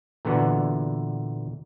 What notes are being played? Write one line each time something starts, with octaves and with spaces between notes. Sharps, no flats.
A#2 D3 E3 B3 F#4